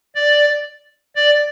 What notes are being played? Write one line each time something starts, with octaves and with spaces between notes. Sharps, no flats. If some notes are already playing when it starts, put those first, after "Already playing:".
D5
D5